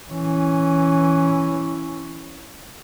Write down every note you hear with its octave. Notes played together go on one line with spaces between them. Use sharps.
E3 C#4